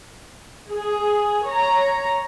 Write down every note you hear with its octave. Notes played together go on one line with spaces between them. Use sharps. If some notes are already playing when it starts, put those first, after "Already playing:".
G#4
C#5 A#5